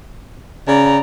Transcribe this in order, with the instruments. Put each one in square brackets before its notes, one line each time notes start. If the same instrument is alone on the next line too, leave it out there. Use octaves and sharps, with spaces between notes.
[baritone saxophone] C#3 [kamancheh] D5 A#5